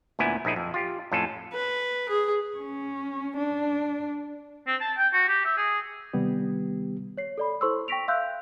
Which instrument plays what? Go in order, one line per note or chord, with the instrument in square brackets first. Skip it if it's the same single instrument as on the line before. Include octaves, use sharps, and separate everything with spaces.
[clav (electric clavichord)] D2 A#2 B3 E4 G#5
A#1 D#4 E4 G#4
F2
F4 G4
F2 A2 C#4 F4 A4
[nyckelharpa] B4
G#4
[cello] C#4
D4
[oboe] C4
A5
G5
F#4
G4
E5
G#4
[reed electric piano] C3 D#3 G3 B3 G4
[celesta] C#5 C7
A4 D5 B5
E4 A4 C5 C6 C#6 E6
G5 C#6 A#6 B6 D7 F7
E5 F5 C6 E6 F#6 G6